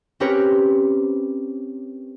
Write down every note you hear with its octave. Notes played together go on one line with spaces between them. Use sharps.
C4 C#4 G4 A#4 B4 C#5